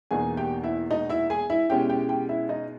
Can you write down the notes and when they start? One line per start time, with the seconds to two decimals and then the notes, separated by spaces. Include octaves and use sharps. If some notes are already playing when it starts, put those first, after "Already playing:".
0.11 E2 B2 A#3 D#4 G#4 G#5
0.37 G4 G5
0.63 E4 E5
0.91 D#4 D#5
1.10 E4 E5
1.30 G#4 G#5
1.50 E4 E5
1.69 B2 G#3 C#4 E4 G4 G5
1.89 G4 G5
2.09 G4 G5
2.29 E4 E5
2.49 D#4 D#5